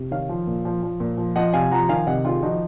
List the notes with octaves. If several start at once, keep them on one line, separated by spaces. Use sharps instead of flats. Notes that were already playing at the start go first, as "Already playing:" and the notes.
Already playing: C3
D#3 C#5 F5
F3
A#2
F3
F3
A#2
F3
F3 D#5 F#5
C3 F5 G#5
F3 F#5 A#5
D#3 F5 G#5
C3 D#5 F#5
D#3 F4 G#4
F3 D#4 F#4